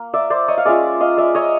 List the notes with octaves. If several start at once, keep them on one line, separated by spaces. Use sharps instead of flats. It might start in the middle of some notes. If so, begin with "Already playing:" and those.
Already playing: A#3
D5 E5
C5 D5
C#5 D#5
F5
G#3 C#4 F4 D5 E5
D#5 F5
D5 E5
C#5 D#5